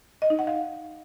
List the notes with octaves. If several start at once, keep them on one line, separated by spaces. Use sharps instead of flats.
D#5
D#4
F#5
F5